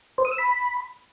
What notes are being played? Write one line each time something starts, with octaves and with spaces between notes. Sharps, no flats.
C5
D#6
E6
B5